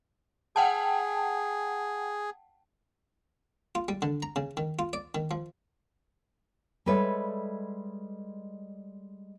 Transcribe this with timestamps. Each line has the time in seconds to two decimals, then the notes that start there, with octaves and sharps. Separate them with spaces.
0.56 G#4 F#5 G5 A5
3.75 F4
3.88 G3
4.02 D3
4.23 A#5
4.36 C#3
4.57 D#3
4.79 F4
4.93 D5
5.15 D#3
5.31 F3
6.86 G3 G#3 A4 B4 C#5 E5